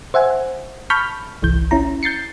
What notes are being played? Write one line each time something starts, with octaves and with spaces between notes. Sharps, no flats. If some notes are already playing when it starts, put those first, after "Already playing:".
C5 E5 F#5 G#5
A5 B5 C#6 F6 G6 B6
G1 C2 E3 G6
C#4 E4 A#5
G6 A6 C7 C#7